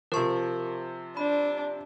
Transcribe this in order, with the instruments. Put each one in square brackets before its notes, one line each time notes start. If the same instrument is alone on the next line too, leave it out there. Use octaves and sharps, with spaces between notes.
[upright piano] C3 F3 [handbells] A#4 A5 C#6
[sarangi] D4 [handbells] B5